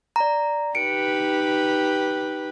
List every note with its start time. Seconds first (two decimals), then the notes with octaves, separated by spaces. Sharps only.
0.16 D5 A#5
0.75 D#4 G4 B4 C#7 D7